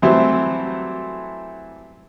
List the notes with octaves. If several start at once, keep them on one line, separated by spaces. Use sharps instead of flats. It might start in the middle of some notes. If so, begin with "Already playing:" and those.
E3 F#3 G3 A3 C4 E4